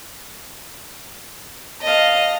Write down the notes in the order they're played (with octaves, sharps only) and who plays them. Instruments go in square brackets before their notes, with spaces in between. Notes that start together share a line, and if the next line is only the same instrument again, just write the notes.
[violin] D#5 [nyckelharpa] F5 A5